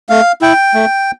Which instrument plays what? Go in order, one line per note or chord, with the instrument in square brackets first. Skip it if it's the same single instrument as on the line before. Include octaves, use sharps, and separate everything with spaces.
[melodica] A3 F5
E4 G5
A3